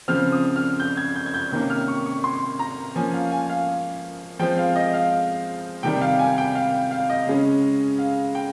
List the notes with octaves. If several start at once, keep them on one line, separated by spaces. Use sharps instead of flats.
C#3 F3 C4 F6
D#6
F6
G6
G#6
G6
G#6
G6
C3 D#3 A#3 C#4 G6
F6
C#6
C#6
C6
A#5
F3 A#3 C#4 G#5
F5
G#5
F5
F3 G#3 C4 G5
F5
D#5
F5
C3 D#3 G3 G5
F5
G#5
G5
F5
F5
D#5
C#3 G#3 C#4
F5
G5